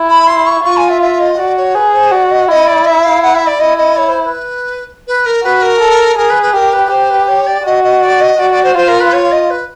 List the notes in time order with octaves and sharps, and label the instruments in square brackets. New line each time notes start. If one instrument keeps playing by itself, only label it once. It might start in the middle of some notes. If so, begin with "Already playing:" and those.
Already playing: [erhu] E4
[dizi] B5
C6
C#6
[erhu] F4 [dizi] C#6
[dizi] G#5
E5
E5
D#5
[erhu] F#4 [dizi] D5
[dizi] C#5
[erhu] G#4 [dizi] B4
[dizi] C5
[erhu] F#4 [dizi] D5
[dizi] D#5
[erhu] E4 [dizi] D#5
[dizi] D5
E5
F5
F#5
E5
D5
[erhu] E4 [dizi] D#5
[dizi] D#5
C#5
C5
C5
B4
B4
A#4
[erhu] F#4 [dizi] B4
[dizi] A#4
[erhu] A4
[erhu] G#4 [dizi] A#4
[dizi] B4
B4
[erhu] G4 [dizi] A#4
[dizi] B4
[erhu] G4 [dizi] C5
[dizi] B4
C#5
D5
[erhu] F#4 [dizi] D#5
[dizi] D#5
D5
D#5
[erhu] F#4 [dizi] D5
[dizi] D5
C5
[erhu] F4 [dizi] C5
[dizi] A#4
B4
C#5
D#5
B4